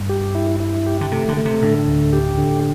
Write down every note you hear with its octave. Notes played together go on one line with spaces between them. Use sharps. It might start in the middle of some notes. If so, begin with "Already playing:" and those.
Already playing: G2
G4
E4
E4
G4
D3
C3 A3
D3
A3
C3
A2 D3
D2
G4
D3